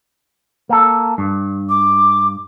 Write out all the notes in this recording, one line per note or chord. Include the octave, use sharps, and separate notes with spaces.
A#3 A4
G2
D6